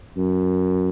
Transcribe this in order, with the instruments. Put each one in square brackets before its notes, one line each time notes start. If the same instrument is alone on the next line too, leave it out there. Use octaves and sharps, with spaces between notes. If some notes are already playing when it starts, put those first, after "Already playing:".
[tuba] F#2